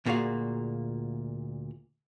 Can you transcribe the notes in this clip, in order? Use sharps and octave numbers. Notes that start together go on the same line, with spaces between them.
D2 A#2 A#3 F#4 G#4 F5